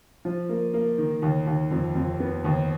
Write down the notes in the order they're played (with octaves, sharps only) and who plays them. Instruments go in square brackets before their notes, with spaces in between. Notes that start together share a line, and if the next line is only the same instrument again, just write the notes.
[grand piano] F3
A#3
A#3
D#3
D#2
D#2
F2
F2
B3
D#2